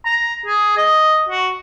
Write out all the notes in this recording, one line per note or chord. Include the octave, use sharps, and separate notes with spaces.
A#5
G#4
D#5
F#4